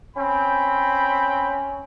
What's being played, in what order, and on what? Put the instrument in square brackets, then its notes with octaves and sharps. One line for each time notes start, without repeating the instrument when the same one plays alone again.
[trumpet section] C4 G5 B5 [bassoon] C#4